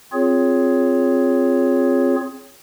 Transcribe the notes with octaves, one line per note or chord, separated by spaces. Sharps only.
C4 F4 G#4 C#5